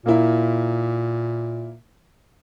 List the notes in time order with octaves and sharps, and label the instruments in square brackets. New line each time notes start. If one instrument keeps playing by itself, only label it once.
[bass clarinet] A#2 [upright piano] A#3 E4